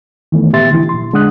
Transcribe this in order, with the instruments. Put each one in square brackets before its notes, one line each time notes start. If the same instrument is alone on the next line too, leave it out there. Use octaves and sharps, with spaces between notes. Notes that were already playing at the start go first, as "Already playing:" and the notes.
[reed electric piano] D#3 E3 A3 B3
A#2 B3 G4 E5 C6 A6
D3 E3 F3 E4
A#2 C6
D3 G#3 D4 F#5 D#6 F#6